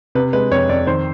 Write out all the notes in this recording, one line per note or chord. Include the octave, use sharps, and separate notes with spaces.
C3 B4
G#3 B4
F2 C#5
F2 D5
D#3 C5